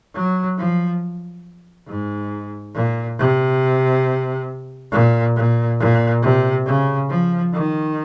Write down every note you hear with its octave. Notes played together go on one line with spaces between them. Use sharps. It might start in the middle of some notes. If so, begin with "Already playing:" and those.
F#3
F3
G#2
A#2
C3
A#2
A#2
A#2
C3
C#3
F3
D#3